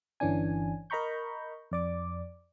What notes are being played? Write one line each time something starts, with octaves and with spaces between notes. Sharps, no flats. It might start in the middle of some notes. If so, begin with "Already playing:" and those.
G1 E3 C#4 D4 G#5
A#4 D#5 A#5 B5 C#6 G6
F2 D5 D6